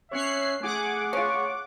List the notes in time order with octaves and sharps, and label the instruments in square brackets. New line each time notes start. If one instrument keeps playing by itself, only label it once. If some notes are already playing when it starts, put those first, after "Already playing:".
[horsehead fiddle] C#4 [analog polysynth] C#5 F#6 C7 [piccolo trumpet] E5
[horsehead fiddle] A3 G#4 [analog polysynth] F#5 D6 [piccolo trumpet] G#5
[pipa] C#4 F4 [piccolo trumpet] C#6